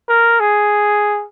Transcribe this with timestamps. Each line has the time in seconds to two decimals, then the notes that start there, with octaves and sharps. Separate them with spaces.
0.09 A#4
0.40 G#4